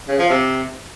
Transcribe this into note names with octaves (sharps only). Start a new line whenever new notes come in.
C#3
F3
C3